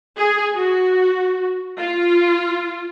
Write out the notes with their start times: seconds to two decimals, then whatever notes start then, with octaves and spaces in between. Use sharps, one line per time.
0.18 G#4
0.55 F#4
1.77 F4